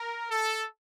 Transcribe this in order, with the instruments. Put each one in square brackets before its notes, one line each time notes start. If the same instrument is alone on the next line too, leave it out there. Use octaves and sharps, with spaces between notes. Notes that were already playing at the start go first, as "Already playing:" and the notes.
Already playing: [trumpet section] A#4
A4